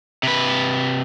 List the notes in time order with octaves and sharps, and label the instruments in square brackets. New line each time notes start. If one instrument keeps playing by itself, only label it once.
[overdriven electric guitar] C3 B4